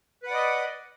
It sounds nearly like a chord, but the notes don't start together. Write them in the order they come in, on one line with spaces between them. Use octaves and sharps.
B4 F#5 D5 D#5